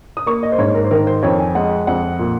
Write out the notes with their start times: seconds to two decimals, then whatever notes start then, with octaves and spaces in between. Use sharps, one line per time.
0.17 D#6
0.26 A#3 C#6
0.43 D#5
0.52 C5
0.58 G#2 C#5
0.75 A#4
0.85 C5
0.91 D#3 A#4
1.07 C5
1.23 F2 C#5
1.39 G#5
1.55 G#3 F#5
1.87 F2 F#5
2.19 A#2